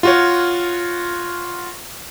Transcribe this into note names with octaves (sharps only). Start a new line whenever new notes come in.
F4 F#4 C#5